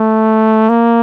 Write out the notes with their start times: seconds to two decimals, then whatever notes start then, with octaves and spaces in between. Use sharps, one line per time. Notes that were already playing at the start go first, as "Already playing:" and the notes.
Already playing: A3
0.69 A#3